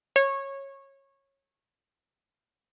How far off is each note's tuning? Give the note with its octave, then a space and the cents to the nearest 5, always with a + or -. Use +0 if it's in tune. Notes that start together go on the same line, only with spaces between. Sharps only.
C#5 -20